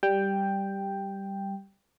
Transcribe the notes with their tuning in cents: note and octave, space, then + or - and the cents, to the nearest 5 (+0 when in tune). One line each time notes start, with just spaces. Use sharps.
G3 +0 G5 +5